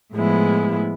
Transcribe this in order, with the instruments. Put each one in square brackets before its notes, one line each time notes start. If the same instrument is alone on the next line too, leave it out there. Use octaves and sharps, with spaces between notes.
[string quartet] A2 F3 G#3 B3 E4